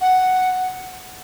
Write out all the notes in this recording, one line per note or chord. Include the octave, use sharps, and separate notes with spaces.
F#5